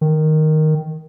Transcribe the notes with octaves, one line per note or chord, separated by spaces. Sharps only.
D#3